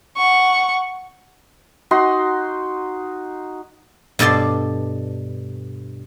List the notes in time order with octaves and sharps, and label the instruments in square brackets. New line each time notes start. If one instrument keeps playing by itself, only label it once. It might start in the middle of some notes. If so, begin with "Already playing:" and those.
[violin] F#5 C#6
[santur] D#4 F#4 C6
[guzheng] G2 B2 A4 D5 C6